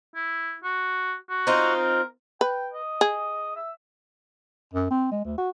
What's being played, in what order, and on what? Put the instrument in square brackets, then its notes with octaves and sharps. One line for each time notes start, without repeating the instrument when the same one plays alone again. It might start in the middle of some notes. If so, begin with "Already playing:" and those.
[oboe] E4
F#4
F#4
[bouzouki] C4 D#4 F4
[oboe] A#4
[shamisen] B4 [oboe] G5
[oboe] D#5
[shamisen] G#4
[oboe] E5
[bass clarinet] F#2
C4
G#3
D2
F#4